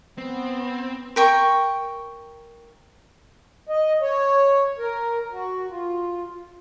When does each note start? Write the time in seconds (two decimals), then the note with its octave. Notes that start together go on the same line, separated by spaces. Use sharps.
0.18 B3 C4
1.16 A#4 G5 C#6
3.69 D#5
4.02 C#5
4.79 A#4
5.32 F#4
5.69 F4